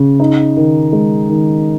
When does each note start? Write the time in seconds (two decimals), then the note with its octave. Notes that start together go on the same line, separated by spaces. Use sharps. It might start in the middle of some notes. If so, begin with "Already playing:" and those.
Already playing: C#3
0.20 D#4
0.57 D#3
0.93 G#3
1.29 D#3